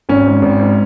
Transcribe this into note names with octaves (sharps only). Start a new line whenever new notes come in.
G#1 C#4
G#2
G#1
G#2